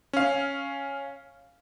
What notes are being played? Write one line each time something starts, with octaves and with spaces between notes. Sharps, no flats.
C#4 F5